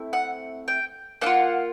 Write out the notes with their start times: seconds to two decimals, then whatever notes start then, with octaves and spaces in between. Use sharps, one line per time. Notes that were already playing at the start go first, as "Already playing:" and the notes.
Already playing: A3 C4 E4
0.13 F#5
0.68 G5
1.21 A#3 D4 F#5
1.26 F4